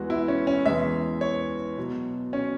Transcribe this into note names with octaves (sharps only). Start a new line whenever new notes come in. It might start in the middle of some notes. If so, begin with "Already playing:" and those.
Already playing: E2 E3 G#3 F#4
E4
C#4
C#4
E2 E3 G#3 E5
C#5
B2 F#3
C#4